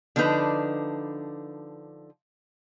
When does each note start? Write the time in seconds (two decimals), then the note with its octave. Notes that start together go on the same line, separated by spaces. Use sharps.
0.16 D3 F3 D4 D#4 B4